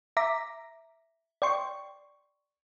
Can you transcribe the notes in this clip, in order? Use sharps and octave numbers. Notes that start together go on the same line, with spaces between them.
E5 A#5 D6 A#6 B6
D5 G5 C6 C#6